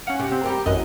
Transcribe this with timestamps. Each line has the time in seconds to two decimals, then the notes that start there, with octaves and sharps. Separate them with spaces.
0.07 C#4 F5 F#5
0.19 C3 G4
0.31 C4
0.43 G3 G4 A#4
0.66 A1 F#2 F#4 A#4 D#5